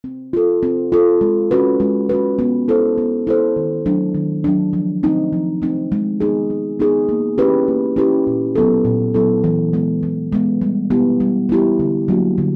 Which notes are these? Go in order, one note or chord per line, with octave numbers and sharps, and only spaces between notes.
C4
F4 A4
C4
F4 A4
G#3
C#4 F#4 B4
G#3
C#4 F#4 B4
B3
E4 A4 C5
B3
E4 A4 C5
D#3
F#3 A3 D4
D#3
F#3 A3 D4
F3
A3 C4 D#4
F3
A3 C4 D#4
G#3
B3 D#4 G#4
G#3
B3 D#4 G#4
A#3
C#4 E4 G4 B4
A#3
C#4 E4 G4 B4
A#2
F#3 B3 E4 A4
A#2
F#3 B3 E4 A4
E3
G#3 B3
E3
G#3 B3
G3
B3 E4 G4
G3
B3 E4 G4
D3
F#3 A#3 D4 F#4
D3